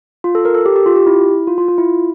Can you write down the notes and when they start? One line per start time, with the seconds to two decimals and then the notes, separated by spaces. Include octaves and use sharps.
0.24 F4
0.35 A4
0.45 A#4
0.55 A4
0.66 G4
0.76 G4
0.86 F4
0.96 G4
1.06 E4
1.47 F4
1.58 F4
1.68 F4
1.78 E4